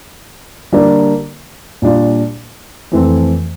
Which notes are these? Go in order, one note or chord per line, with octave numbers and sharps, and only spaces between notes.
D3 G3 A#3 D4
A#2 G3 D4 F4
F2 E3 A3 C4